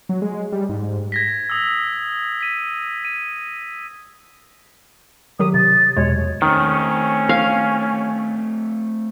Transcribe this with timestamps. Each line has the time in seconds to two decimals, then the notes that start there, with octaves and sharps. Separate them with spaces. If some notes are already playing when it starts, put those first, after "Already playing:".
0.09 F#3
0.22 G#3
0.52 G3
0.69 G#2
1.12 G#6 A#6 B6
1.50 D#6 E6
2.41 B6 D#7
3.05 D#7
5.39 D#3 F#3 G4 D#6
5.54 C3 A6
5.96 E2 B2 G#3 C#5
6.42 D#3 A3 C4 C#4
7.29 F5